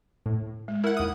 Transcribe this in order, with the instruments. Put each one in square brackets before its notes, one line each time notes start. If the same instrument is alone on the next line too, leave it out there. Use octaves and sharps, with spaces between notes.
[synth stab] A2
[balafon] G#3
[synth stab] E4 F#5 [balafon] A#4
[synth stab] D#2 D#6